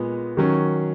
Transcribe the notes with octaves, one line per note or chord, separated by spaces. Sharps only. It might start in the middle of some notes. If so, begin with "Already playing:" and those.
Already playing: A#2 G#3 B3
D#3 F#3 C#4